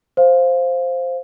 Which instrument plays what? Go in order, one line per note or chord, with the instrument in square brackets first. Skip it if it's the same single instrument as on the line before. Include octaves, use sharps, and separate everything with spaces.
[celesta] C5 F5